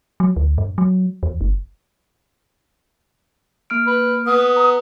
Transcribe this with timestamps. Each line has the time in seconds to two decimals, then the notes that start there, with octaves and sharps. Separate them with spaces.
0.20 F#3
0.36 D2
0.58 G2
0.78 F#3
1.23 E2
1.41 G1
3.70 A#3 F6 D7
3.87 B4
4.27 B3 D#6
4.57 A#5